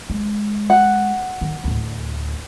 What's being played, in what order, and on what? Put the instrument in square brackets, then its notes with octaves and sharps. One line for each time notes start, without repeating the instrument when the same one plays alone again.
[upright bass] G#3
[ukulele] F#5
[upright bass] D#3
D2 A2